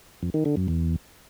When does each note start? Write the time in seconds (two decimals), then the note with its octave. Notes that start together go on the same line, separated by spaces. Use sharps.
0.23 F2
0.34 D#3
0.45 D3
0.57 F#2
0.68 E2